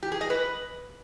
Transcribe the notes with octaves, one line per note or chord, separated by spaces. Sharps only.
G4
G#4
D#5
B4